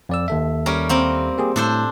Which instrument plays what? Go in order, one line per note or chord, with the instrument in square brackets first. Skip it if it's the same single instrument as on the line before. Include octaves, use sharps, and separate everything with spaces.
[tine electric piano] F2 D5 E6
D#2 A4 E5
[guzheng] G3 C#4 A#4
A#3 C4 A#4
[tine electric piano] A#3 G4 G#4
[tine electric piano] A2 [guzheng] D4 A4 C5